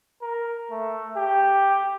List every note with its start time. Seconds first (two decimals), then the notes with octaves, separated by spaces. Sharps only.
0.22 A#4
0.71 A3
1.16 G4